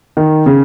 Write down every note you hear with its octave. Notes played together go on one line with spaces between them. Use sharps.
D#3
C#3